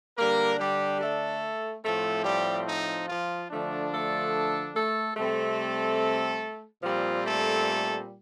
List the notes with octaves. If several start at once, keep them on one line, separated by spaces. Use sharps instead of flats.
D3 G3 A#3 D4 A#4
G3 G4
A3 A4
A2 F3 A3 C4 A4
G3 G4
D#4
F3 F4
D3 F3 A3 D4
A3 A4
A3 A4
C3 G3 A3 C4 A4
A#2 F3 G3 C4 F4
A3 A4